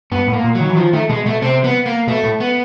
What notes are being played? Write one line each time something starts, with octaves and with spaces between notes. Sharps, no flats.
G2 B3
A2
A#3
A#2
F#3
D#3
E3
D#3 F3
D#3 A3
B2 G#3
B2 A3
C3 C4
B3
A#3
B2 A3
A2
B3